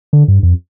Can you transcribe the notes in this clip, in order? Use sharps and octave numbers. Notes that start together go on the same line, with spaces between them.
D3
G2
F2